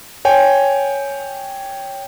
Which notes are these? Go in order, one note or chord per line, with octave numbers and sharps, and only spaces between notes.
C#5 G5 G#5